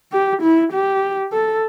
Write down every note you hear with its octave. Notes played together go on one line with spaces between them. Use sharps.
G4
E4
G4
A4